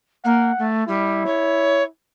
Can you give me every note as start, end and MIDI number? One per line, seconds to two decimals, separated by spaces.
0.24 0.51 58
0.24 0.68 78
0.58 0.83 57
0.87 1.23 55
0.87 1.88 64
1.25 1.82 73